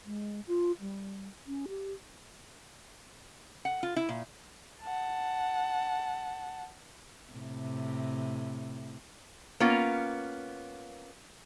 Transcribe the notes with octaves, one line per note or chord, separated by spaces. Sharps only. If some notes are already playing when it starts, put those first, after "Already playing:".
G#3
F4
G3
C#4
G4
F#5
F4
E4
A#2
F#5 A5
A2 C3
A#3 B3 C#4 F4